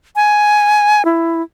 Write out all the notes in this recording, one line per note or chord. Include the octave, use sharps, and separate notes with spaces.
G#5
E4